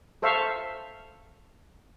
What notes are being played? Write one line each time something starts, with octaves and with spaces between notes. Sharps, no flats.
A4 C5 E5 F5 C#6